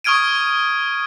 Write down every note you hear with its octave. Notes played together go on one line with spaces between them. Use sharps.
C#6 D#6 F6 G#6 D7 D#7